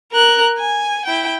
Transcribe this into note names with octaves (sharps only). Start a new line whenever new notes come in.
A#4 F#6
G#5
E4 G5